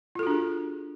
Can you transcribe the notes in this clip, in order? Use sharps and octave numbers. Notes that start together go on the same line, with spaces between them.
D4 F4 F#4 G#4 A4